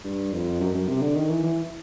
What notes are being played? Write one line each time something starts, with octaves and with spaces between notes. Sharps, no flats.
G2
F2
F#2
F#2
C3
D3
D#3
E3
E3